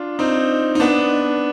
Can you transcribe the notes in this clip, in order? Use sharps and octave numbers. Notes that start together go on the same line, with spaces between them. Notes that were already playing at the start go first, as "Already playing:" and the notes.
Already playing: D4 F4
C4 D#4
D#4
B3 D4